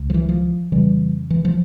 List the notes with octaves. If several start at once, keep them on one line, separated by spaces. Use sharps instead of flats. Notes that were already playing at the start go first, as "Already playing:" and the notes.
Already playing: C#2 C#3
F3
E3
F3
F2 C#3 E3 G3
E3
F3